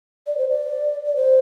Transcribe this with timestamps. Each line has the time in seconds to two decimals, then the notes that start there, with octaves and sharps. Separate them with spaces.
0.27 D5
0.38 C5
0.49 D5
1.06 D5
1.16 C5